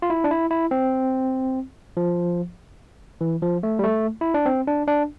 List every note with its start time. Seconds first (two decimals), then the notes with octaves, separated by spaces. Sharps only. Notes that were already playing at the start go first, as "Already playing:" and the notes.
0.02 F4
0.10 E4
0.24 D4
0.31 E4
0.51 E4
0.71 C4
1.97 F3
3.21 E3
3.42 F3
3.63 A3
3.79 G3
3.84 A3
4.21 E4
4.34 D4
4.46 C4
4.68 D4
4.87 D4